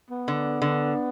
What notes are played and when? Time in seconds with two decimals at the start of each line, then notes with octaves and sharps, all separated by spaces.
0.10 B3
0.28 D3
0.62 D3